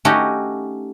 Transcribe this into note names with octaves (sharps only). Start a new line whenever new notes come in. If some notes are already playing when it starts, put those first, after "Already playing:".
A3 C#4 D#4 F#4 G4